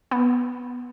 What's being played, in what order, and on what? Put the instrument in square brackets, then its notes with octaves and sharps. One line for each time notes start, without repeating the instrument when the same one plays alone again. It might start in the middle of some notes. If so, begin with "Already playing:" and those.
[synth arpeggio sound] B3